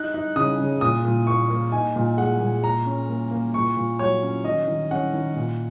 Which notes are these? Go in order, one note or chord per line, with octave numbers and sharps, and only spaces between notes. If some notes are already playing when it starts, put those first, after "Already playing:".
Already playing: D#4 F#6
D#4
C#3 D#6
C#3
A#2 D#6
A#2
A#3 C#6
A#3
D#4 G#5
A#2
G#3 F#5
A#2
A#3 A#5
C#4
A#3
A#3
A#2 C#6
A#2
F#3 C#5
C#4
D#3 D#5
D#3
C#4 F#5
D#3
A#2